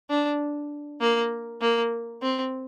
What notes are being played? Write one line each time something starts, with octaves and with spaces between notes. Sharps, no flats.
D4
A#3
A#3
C4